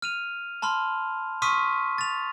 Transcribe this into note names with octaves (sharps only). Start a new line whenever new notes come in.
F6 D#7 F7
A5 B5 C6 F6
C6 C#6 D#6 F6 B6 D#7
A6 F7